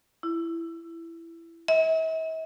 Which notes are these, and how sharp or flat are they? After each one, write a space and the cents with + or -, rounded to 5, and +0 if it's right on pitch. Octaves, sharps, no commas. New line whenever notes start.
E4 +15
E5 -45